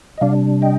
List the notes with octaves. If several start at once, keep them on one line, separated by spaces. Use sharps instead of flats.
D#5
C3 G3 D4 D5 F5
D#5 G5